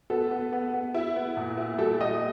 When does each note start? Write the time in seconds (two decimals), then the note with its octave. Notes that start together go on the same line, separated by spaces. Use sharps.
0.10 B3 A4
0.31 B3
0.53 B3
0.73 B3
0.94 E4
1.16 B3
1.37 A#2
1.57 E4
1.78 G3 A4
2.01 G3 D#5